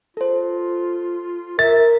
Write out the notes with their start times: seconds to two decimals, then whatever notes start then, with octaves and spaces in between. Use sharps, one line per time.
0.17 F4 A4 C5
1.59 A#4 E5 A6